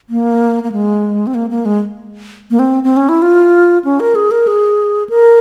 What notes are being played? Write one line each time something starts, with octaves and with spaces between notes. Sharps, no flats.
A#3
A#3
G#3
C4
A#3
A#3
G#3
A#3
C4
C4
C#4
E4
F4
C#4
A#4
G#4
A#4
G#4
A#4